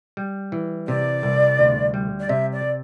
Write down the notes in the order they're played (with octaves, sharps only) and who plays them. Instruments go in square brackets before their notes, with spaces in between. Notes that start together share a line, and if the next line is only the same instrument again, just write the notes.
[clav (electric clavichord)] G3
E3
[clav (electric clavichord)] C3 [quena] D5
[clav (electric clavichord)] C2
D2
G3
[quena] D5
[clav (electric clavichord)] C3 [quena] E5
[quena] D5